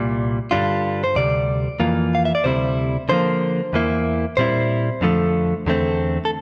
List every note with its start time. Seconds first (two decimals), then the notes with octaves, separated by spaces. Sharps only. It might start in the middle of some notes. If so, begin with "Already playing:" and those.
Already playing: C2 A#2 G3
0.51 G2 D3 G3 D4 F4
1.04 C5
1.15 D2 C3 G3 D5
1.80 F2 E3 A#3 F4
2.15 F5
2.25 E5
2.35 D5
2.44 D2 C3 G3 C4 E4 C5
3.09 D3 F3 A#3 C5
3.73 E2 E3 A#3 E4
4.37 A#2 G3 C4 E4 C5
5.01 F2 D3 F3 A3
5.66 E2 D3 A3 C4
6.25 A4